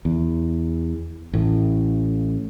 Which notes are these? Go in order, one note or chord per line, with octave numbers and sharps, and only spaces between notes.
E2
A1 A2